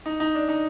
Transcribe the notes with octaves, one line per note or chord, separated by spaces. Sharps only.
D#4
D#4
D4
D#4